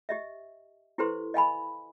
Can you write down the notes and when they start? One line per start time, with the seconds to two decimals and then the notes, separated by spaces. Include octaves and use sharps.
0.09 G4 D#5 E5
0.98 E4 G4 A4 B4 C5 C6
1.34 D#5 F5 G#5 B5